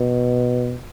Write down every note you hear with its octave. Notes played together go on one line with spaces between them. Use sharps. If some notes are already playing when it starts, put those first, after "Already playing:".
Already playing: B2